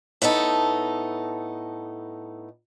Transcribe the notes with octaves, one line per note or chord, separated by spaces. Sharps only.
A2 B3 D#4 A4